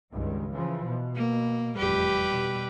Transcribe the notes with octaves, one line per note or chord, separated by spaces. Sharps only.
C#2 G2 D#3
C#3 E3 F3
B2
A#3
F1 E2 A2 G3 G4 B4
B2